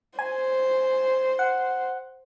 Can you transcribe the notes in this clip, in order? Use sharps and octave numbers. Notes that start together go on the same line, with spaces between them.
C5 G#5
F#5